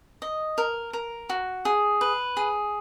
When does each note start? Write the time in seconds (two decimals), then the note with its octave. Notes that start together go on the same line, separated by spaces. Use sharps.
0.22 D#5
0.58 A#4
0.93 A#4
1.29 F#4
1.65 G#4
2.01 B4
2.37 G#4